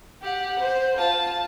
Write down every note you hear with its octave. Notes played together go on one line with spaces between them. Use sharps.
G4 F#5
C5
F4 A5